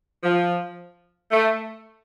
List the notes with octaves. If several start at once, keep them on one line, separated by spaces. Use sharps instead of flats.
F3
A3